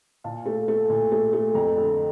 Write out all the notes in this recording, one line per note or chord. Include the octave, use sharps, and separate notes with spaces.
A#2 F5 A5
A3
A3
A#2
A3
A3
F2 G5 A#5
D3